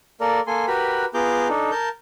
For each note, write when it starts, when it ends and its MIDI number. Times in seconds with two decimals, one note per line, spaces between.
0.21 0.40 58
0.21 0.40 69
0.21 0.40 70
0.21 0.40 74
0.47 0.66 58
0.47 0.66 69
0.47 0.66 80
0.47 0.66 84
0.68 1.05 66
0.68 1.05 67
0.68 1.05 70
0.68 1.05 71
0.68 1.05 83
1.14 1.48 59
1.14 1.48 65
1.14 1.48 68
1.14 1.48 82
1.14 1.48 86
1.14 1.48 91
1.49 1.71 62
1.49 1.71 63
1.49 1.71 69
1.72 1.89 70
1.72 1.89 81
1.72 1.89 91